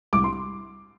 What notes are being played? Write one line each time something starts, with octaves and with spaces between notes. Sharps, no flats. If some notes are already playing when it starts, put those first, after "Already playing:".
C2 D6
C6